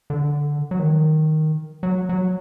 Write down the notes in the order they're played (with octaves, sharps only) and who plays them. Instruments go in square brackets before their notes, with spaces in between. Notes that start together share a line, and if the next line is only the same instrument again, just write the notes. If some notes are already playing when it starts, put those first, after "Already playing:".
[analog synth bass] D3
F#3
D#3
F#3
F#3